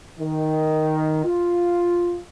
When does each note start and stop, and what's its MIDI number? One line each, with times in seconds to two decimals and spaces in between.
0.20 1.23 51
1.24 2.19 65